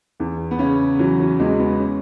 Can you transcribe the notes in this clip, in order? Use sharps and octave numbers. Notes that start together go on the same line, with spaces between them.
E2
B3
C#3 C#4
E3 F#3
F#3
E2 G#3
B3
C#4